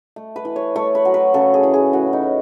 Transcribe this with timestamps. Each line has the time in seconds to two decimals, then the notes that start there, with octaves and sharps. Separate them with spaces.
0.16 A3
0.36 B4
0.45 E3
0.56 C#5
0.76 A3 C#5
0.95 B4
1.05 F#3
1.14 B4
1.34 C#3 A4
1.54 G#4
1.63 E3
1.74 G#4
1.93 A2 F#4
2.07 C#4
2.13 D#4
2.23 A2